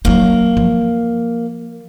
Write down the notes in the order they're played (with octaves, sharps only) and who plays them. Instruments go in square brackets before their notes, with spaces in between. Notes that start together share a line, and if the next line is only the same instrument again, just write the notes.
[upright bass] F#3 D#4 [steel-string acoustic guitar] A#3
[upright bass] F3